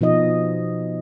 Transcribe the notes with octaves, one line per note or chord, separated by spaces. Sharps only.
B2 F3 D#4 D#5